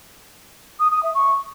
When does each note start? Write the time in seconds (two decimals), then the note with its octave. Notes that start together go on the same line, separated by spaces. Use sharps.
0.80 D#6
0.91 D#6
1.03 E5
1.15 C#6